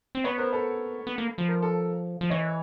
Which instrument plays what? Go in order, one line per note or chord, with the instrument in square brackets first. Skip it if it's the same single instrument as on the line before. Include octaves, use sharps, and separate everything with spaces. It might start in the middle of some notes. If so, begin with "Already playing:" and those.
[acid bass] C4
[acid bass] B3 [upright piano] B4 C#5
[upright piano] A#4 C5
A4 B4
[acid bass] B3
A#3
F3
[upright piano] A#4
A4
[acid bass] F3
[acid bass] E3 [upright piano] C#5 D#5